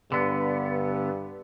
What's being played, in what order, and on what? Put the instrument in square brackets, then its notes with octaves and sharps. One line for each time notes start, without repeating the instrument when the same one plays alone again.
[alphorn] G2 [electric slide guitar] D3 B3